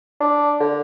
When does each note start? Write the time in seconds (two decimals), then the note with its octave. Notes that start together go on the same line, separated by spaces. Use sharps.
0.20 D4
0.60 D3